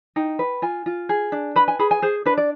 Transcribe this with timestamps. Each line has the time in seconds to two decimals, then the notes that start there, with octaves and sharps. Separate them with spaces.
0.16 D#4 G5
0.39 B4
0.62 F4 G#5
0.86 F4
1.09 G#4
1.32 D4
1.56 B4 B5
1.68 G#5
1.79 G#4 B5
1.91 G#5
2.02 G#4 C5
2.25 D4 B4
2.38 D5